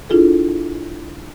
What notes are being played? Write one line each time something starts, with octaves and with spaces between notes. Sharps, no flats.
D4 E4 F4 G#4 A4